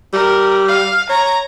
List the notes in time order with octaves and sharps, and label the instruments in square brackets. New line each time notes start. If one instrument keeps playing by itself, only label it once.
[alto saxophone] G3 [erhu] A#4
[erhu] F5
[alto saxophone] C#5 [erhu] A#5